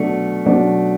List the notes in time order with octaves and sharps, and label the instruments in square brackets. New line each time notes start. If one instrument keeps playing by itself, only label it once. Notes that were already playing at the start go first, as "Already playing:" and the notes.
Already playing: [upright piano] B2 F#3 D4 F#4 [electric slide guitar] A3
[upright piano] B2 F#3 D4 F#4